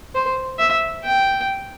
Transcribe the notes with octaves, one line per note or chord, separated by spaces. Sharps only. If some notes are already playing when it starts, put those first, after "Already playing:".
C5
E5
G5